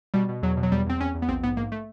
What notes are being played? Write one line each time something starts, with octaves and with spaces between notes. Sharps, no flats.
B2 G3
B2
E2 F#3
B2
F#3
E2 G3
E2 C4
E2 C#4
E2
B3
A#1 C4
G#2 B3
G#2 A#3
A3